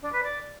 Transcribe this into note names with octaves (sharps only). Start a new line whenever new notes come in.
D4
B4
D5